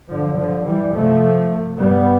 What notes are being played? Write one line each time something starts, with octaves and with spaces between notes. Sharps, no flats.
G2 D3 F3
D3 F3
E3 G3
F2 C3 F3 A3
G2 G3 B3